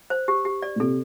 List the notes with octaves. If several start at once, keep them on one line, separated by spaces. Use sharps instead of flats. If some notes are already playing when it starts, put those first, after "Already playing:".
C5
G4
G4
D5
A#2
C3 A4